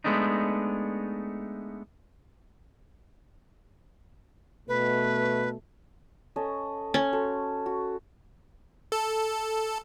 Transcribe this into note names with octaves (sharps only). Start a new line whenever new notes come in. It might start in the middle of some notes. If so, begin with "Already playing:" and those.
G#3 A3 B3 D4 D#4
B2 A3 B4
C#4 A4 D#5
C#4
F#4 A4 C6
F#4
A4